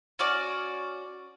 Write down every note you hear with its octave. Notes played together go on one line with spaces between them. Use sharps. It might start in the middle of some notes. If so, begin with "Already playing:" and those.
C#4 F#4 D5